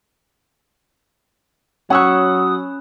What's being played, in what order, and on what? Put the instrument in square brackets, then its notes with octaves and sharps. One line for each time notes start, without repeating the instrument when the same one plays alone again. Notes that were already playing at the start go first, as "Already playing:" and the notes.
[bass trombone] F#3 [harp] C#4 B5 C#6 [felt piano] F#5 E6 F#6 [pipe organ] D#6